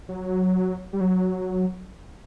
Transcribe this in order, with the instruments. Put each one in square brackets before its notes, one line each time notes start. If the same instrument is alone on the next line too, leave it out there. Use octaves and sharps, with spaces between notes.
[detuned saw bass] F#3
G3
F#3